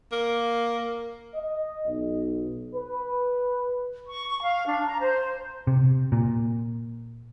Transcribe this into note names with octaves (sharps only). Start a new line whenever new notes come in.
A#3
D#5
B1
B4
C#6
F5
D4
A#5
C5
C3
A#2